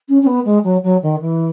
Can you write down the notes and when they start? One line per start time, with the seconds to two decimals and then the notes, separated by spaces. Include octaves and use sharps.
0.09 C#4
0.22 C#4
0.27 B3
0.45 G#3
0.64 F#3
0.84 F#3
1.03 D#3
1.21 E3